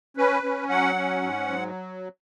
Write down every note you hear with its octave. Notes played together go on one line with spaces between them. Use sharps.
C#4 B4
C#4
F#3 F#5
C#4
G#2
F#3